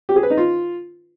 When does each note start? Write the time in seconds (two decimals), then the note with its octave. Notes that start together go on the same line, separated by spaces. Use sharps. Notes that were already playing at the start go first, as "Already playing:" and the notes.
0.09 G4
0.16 G#4
0.23 B4
0.30 D#4
0.37 F4